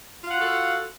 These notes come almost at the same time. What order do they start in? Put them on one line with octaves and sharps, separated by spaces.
F4 F5 F#5 F#4 A4